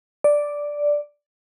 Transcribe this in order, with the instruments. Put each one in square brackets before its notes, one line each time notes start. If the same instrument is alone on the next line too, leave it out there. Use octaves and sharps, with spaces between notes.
[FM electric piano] D5